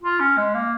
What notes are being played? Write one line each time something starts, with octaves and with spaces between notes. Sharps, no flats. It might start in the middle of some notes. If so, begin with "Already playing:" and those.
F4
C#4
G#3
A#3